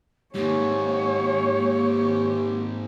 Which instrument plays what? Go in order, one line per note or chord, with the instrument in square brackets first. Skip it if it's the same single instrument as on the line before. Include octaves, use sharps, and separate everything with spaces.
[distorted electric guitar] G#2 D#3 [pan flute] A#3 [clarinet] G4 [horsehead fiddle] C#5